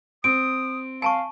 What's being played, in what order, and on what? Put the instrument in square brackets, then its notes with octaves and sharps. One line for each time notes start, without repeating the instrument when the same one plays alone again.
[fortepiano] C4 [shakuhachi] D#6 [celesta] D7
[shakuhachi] F5 [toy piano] G#5 A5 C#6